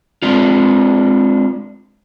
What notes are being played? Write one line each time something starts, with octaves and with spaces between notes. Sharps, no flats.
G#3 C4 D4 F4